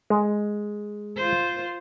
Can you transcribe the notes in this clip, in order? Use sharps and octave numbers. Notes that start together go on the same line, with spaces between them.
G#3
F4 C5